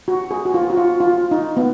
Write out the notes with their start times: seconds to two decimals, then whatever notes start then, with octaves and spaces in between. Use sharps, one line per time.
0.08 F#4
0.31 G#4
0.45 F#4
0.54 F4
0.70 F#4
0.77 F4
1.00 F4
1.31 D#4
1.57 B3